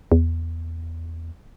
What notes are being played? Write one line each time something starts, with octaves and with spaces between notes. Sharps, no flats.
E2